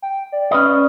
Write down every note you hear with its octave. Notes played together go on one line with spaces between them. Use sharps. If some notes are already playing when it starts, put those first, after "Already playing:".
G5
D5
C#4 B4 D#5